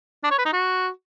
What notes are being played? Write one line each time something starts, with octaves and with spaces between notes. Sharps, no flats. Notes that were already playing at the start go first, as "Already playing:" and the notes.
D4
C#5
B4
D#4
F#4